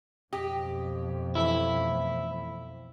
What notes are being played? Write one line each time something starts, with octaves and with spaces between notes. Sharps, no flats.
B1 F2 G4 D#5
E3 A3 E4 B6